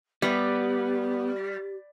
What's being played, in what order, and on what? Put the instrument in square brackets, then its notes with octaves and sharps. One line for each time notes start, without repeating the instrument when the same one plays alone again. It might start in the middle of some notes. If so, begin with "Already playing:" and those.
[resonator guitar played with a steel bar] G3 [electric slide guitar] B3 [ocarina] G4